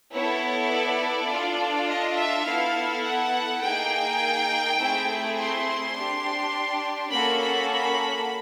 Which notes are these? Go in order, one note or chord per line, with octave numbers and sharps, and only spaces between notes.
B3 E4 A4 C#5
D5
D4 F4 A4
D#5
E5
B3 E4 A4 F5
F#5
A#3 D#4 G#4 G5
A3 C4 E4 G#4
C6
D4 G4
A#3 C#4 F#4 A4 B5
B5
B5